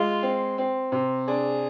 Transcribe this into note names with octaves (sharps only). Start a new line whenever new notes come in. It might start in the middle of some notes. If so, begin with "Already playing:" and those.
Already playing: G#3 F4
C4
C4
C3
D4 G#4